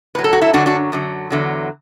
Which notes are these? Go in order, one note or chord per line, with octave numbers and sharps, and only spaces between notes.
A2 F#3 B4
A4
F#4
E4 A4
F#2 D3 F#3 D4 F#4
D4 F#4
F#2 D3 F#3
E2 D3 F#3